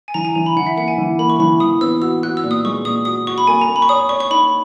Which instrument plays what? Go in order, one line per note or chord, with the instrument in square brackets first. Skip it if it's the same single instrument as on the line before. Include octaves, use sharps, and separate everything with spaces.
[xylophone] G#5
[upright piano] E3 [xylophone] A#5
[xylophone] G#5
[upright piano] E3 [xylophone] A#5
[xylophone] B5
[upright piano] E3 [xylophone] F#5
[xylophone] E5
[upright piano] A#3 [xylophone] F#5
[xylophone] G#5
[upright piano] E3
[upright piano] A#3 [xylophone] B5
[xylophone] C#6
[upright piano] E3 [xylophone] B5
[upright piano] E3 [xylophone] D#6
[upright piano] B3 [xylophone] E6
[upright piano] F#4 [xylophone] E6
[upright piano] F#4 [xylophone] F#6
[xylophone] E6
[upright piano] A#2
[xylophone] D#6
[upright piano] G#3 [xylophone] C#6
[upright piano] A#2 [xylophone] D#6
[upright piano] F#4 [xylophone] D#6
[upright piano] F#4 [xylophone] C#6
[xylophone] B5
[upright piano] A#3 [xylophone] G#5
[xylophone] A#5
[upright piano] A#3
[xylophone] B5
C#6
[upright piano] C#5 [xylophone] D#6
[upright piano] C#5 [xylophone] C#6
[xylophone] C#6
[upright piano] D#4 [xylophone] B5